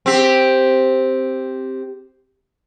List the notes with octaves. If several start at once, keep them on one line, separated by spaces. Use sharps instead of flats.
C4 G4